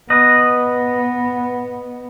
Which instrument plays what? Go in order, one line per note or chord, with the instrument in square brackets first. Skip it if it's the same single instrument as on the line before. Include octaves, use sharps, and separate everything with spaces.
[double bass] B3 [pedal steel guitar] B4 D#5